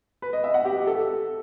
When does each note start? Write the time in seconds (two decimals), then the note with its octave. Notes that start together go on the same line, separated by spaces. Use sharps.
0.22 B4
0.33 D#5
0.44 E5
0.54 F#5
0.65 G4
0.76 G4
0.87 A4